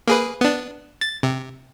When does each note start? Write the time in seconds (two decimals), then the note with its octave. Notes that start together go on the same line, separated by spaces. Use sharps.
0.07 A#3 G#4 B4
0.41 B3 D4
1.01 A6
1.23 C3